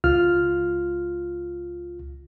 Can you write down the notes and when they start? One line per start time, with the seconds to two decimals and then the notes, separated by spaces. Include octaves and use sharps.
0.04 C#2 F4 F6